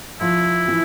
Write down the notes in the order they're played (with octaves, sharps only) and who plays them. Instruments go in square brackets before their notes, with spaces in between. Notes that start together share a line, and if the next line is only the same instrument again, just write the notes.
[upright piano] F3 [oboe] E4
[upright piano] E3